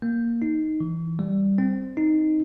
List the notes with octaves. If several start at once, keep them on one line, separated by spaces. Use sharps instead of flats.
A#3
D#4
E3
G3
C4
D#4